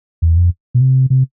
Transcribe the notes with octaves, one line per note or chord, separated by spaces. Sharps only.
E2
F2
B2
C3
C3